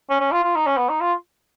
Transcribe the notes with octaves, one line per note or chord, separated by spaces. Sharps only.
C#4
C#4
F4
F4
D#4
C#4
B3
D#4
F4